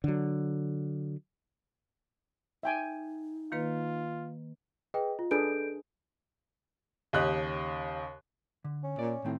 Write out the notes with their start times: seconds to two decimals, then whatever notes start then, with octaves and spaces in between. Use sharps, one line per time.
0.04 D3 F#3
2.63 D#4 E5 G5 G#5
3.52 D#3 A#3 F4 B4
4.94 G#4 B4 D#5 G5
5.19 F4
5.31 D4 G#4 A4 B4 G6 D7
7.13 D#2 C#3 G4 D#5 F#6
8.64 D3
8.84 C#4
8.99 A#2 D5
9.25 A2 D#3 C4